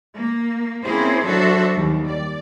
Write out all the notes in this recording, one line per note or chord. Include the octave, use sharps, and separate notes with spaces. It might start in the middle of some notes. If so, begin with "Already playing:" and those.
A#3
A#3 C4 C#4 E4 G#4 C5
F#3 D4 F#4 A4 C5 E5
D#2 G3
D5